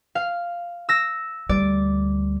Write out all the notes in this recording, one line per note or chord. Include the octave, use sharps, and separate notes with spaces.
F5
E6 A#6
D2 G3 D5